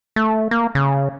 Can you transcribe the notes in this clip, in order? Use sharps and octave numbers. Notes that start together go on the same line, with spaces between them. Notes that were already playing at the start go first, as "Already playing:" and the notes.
A3
A#3
C#3